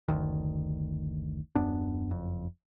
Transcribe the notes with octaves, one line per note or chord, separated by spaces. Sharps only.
F#1 D2 D#3
D#1 F#2 B3 D4
F#1 F2